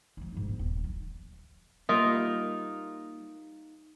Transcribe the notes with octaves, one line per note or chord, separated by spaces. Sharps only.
F3 A3
D#1 G#2
B3
D#1
F#3
G3 A#3 D#4 F4 A#4 E5